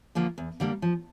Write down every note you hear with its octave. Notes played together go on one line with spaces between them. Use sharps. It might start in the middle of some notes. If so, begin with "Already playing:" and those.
D3 F3 A#3
E2
D3 G3 A#3
F3